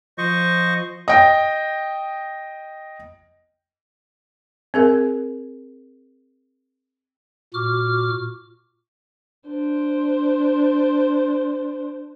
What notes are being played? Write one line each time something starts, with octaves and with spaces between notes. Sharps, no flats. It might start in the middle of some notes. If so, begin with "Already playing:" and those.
F3 C5 D#5 C#6
D#5 G5
C4 G#4 A#4
A#2 F#4 D6 F6
D4 C5